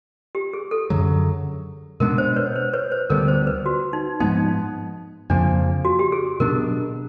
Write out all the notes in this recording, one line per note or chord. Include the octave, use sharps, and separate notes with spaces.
G4
G#4
A4
F#2 D3 F#3
B2 G#3 B3 D4 A#4
C5
B4 C#5
C5
B4 C#5
C5
D2 D3 G3 B3 A#4
C5
B4
F#4
D#4
G#2 F3 G#3 B3 D#4
F2 C#3 F3 A#3 D4
F#4
G4
G#4
B2 F#3 B3 D4 A#4